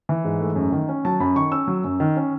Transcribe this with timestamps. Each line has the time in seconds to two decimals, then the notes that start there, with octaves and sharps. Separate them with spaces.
0.09 E3
0.25 G#2
0.40 A3
0.56 F#2
0.72 D#3
0.89 C#4
1.05 F#3 A5
1.20 F#2 B5
1.36 D#3 C#6
1.52 C#4 E6
1.68 F#3
1.84 F#2
2.00 D#3
2.17 C#4